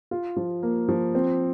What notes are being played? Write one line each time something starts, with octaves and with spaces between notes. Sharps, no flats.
F4
F3
A#3
F3
C4